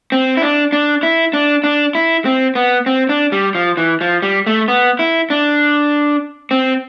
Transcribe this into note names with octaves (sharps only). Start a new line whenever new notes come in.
C4
E4
D4
D4
E4
D4
D4
E4
C4
B3
C4
D4
G3
F3
E3
F3
G3
A3
B3
E4
D4
C4